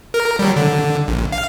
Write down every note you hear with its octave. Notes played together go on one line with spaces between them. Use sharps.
A#4
F#3 G3
D3
A#1
F5